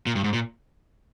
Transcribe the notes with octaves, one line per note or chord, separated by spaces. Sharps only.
A#2
G2
G#2
A#2